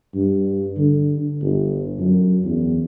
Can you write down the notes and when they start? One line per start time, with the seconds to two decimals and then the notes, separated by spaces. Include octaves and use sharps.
0.14 G2
0.77 D3
1.41 G1
1.99 F#2
2.44 E2